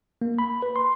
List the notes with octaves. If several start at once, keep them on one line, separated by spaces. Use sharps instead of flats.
A#3
B5
B4
C6